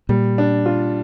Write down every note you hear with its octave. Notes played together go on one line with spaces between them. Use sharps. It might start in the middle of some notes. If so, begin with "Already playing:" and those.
A#2 G3
D4
F4